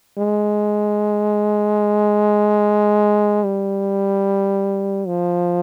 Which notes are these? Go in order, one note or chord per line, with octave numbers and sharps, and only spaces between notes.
G#3
G3
F3